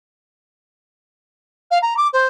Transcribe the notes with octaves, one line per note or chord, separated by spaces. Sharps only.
F5
A#5
D6
C5